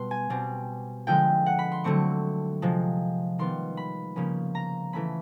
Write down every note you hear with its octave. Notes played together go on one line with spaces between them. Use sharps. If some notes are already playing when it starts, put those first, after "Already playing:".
Already playing: B2 G3 B3 C6
G#5
B2 G3 C4
D3 F3 G#3 G5
F#5
B5
C6
D3 F#3 A3 C4 C#6
C3 F3 G#3
D#3 G3 B3 C6
B5
C#3 F3 A#3 C#4
A#5
E3 A3 C#4 B5